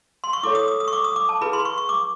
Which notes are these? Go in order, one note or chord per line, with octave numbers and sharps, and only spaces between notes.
C6
C#6
E4 A4 C#5 D6
D#6
D#6
D#6
C#6
D6
D#6
D6
A5
E4 G#4 B4 B5
C6
C#6
C#6
D6